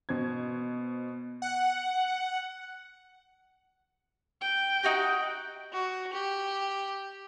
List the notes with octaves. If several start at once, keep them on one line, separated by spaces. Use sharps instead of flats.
B2 C5 G#6
F#5
G5
D#4 F#4 G4
F#4
G4